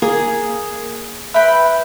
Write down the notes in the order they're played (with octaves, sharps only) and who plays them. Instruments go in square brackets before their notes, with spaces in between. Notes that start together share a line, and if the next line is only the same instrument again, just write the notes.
[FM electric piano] A#3 [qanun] G#4
[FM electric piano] B4 G5 [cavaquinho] E5 B5